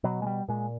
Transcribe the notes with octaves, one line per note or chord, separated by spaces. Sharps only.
B2 F#3
G#3
G3
A#2 G#3